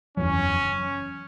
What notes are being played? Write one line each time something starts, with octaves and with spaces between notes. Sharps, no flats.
F#1 E2 C#3 F#3 C#4